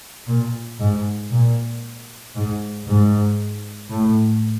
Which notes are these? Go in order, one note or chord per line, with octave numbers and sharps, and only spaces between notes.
A#2
G#2
A#2
G#2
G#2
A2